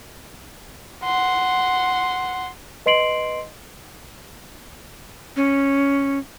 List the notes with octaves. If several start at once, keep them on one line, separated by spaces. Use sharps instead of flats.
F#5 C6
B4 D#5 C6 C7 D7 F#7
C#4